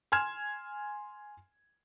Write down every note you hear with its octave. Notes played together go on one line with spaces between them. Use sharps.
G#5 C6 F6 G#6 E7